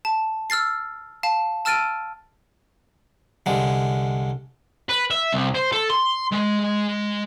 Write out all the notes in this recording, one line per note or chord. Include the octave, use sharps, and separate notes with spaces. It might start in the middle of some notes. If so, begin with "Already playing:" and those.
A5
E6 F6 A6 C7
F5 A5
A5 E6 F6 A6 D7 D#7
C2 D3 G#3
B4
E5
C2
C5
A4
C6
G#3